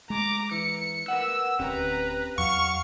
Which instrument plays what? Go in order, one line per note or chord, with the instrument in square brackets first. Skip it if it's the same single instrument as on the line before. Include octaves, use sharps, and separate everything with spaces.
[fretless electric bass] G#3 [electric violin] A#5 D6
[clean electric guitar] E3 [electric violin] C#7
[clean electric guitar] A#4 B4 F#5 [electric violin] E6
[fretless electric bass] D1 [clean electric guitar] C4 C#4 G4 [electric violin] B4 A#5
[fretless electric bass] E2 [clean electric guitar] F#3 [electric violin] F5 [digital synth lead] C#6